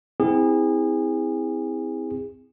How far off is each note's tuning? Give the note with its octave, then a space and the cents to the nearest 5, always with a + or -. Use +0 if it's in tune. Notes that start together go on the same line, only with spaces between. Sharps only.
C4 -20 E4 -25 G#4 -30